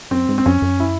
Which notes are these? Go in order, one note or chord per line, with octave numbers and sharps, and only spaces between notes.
F#2 C4
G#2
C4
F#2 C#4
F#2
E4